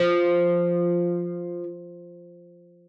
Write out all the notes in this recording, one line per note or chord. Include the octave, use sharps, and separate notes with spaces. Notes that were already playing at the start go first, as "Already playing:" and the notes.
Already playing: F3